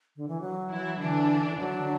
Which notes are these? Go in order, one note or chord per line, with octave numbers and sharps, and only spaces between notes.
D3
E3
F#3
E3 E4
D3 E3 D4
D3 F#3 D4